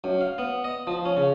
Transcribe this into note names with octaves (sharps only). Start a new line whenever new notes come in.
F#2
F5
B3
D#5
F3
C#4
C#3